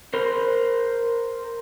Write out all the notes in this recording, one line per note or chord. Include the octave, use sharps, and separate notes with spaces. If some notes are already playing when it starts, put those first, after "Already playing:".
A#4 C5